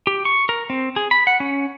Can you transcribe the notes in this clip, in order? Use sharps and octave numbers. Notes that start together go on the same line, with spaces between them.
G4
C#6
A#4
C4
G#4
B5
F#5
C#4